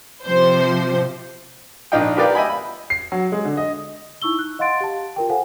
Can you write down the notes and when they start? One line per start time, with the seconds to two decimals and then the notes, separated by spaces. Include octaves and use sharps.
0.24 C3 F3 C5
1.92 A#1 D4 D#4 F5 G5
2.17 G4 A#4 B4 D5 F5 G5
2.35 D#5 E5 G5 G#5 B5
2.50 B5
2.90 C7
3.12 F#3
3.32 G#3
3.45 D3
3.57 D#5
4.22 D#4 E4 C#6 E6 G7
4.39 F#6
4.59 D#5 F5 F#5 C6 A6 D7
4.81 G4 A5
5.16 F4 A#4 G5
5.29 A4 C5 F5 F#5 G#5